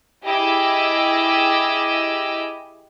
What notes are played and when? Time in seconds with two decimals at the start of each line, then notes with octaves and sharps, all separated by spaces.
0.24 E4 G4 G#4 D#5 D6 E6